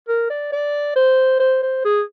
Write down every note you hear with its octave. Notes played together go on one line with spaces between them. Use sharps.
A#4
D5
D5
C5
C5
C5
G#4